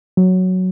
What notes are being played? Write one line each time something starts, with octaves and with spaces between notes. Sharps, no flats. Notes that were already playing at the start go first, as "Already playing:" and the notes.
F#3